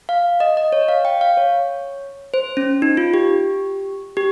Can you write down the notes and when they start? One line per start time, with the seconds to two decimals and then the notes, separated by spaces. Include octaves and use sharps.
0.09 F5
0.40 D#5
0.57 D#5
0.72 C#5
0.88 F5
1.05 G5
1.21 F5
1.37 C#5
2.34 C5
2.57 C#4
2.82 D#4
2.97 F4
3.14 G4
4.17 G4